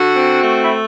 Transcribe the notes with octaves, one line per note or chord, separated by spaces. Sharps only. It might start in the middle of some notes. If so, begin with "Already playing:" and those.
Already playing: D3 F#4
C4
A3
E4